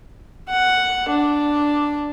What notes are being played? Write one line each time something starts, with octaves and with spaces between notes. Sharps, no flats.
F#5
D4